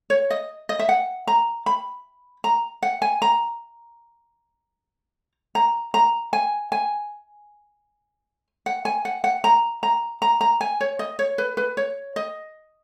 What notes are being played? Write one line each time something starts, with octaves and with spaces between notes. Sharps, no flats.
C#5
D#5
D#5
E5
F#5
A#5
B5
A#5
F#5
G#5
A#5
A#5
A#5
G#5
G#5
F#5
G#5
F#5
F#5
A#5
A#5
A#5
A#5
G#5
C#5
D#5
C#5
B4
B4
C#5
D#5